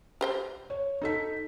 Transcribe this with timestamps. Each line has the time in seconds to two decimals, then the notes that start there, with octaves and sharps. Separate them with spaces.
0.21 G4 C5 G5
0.70 C#5
1.02 D#4 A4 B6